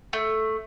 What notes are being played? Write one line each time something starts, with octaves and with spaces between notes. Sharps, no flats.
A3